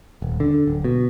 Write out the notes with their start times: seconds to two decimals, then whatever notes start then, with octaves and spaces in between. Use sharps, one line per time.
0.22 D#1
0.40 D3
0.67 D1
0.84 B2